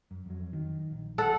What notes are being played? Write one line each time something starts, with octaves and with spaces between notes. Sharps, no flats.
F#2
F2 F#3
D#3
A#1
A4 F#5